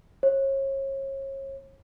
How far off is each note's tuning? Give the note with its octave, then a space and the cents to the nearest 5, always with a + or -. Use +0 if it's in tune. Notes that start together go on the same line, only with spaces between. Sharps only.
C#5 -35